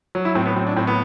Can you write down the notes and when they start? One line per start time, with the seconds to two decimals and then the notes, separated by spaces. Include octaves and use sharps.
0.15 F#3
0.25 E4
0.35 A2 C4
0.46 B3
0.56 F#3 C4
0.67 D4
0.76 A2 C4
0.87 B3